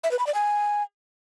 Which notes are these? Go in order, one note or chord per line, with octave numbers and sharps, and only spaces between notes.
E5
B4
B5
D5
G#5